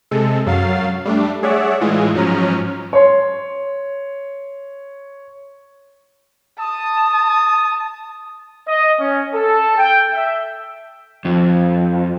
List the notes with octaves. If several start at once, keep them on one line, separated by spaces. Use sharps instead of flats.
C3 G#3 A4
F#2 F#3 F5 A6 C7
G3 A3 D4
G#4 C#5 D5 E5 F#5
A2 E3 G#3 F4 G#4
G#2 F3 F#3 C#4 A#5 F6
C#5 C6
A5 D#6
D#5
C#4
A4
G5
E5
F2 F3